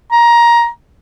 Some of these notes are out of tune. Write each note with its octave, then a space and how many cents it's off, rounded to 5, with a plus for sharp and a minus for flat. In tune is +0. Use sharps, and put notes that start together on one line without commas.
A#5 +15